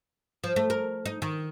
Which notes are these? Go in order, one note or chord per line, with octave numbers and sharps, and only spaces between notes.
F3
A3
A#4
D#4
D#3